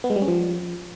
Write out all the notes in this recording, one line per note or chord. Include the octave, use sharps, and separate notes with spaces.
B3
G#3
G3
C#4
F3